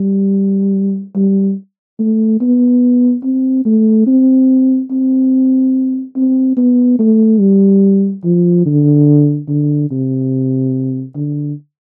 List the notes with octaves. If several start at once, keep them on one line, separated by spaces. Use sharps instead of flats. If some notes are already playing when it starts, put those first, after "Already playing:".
Already playing: G3
G3
A3
B3
C4
A3
C4
C4
C4
B3
A3
G3
F3
D3
D3
C3
D3